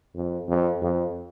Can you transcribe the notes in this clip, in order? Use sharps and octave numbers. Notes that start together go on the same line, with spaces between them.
F2
F2
F2